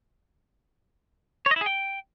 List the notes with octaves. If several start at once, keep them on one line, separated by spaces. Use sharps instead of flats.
C#5
D#5
E4
G#4
G5